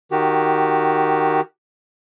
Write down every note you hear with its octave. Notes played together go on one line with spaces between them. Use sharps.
D#3 F#4 G4